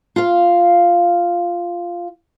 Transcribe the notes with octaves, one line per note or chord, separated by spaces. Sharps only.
F4 F5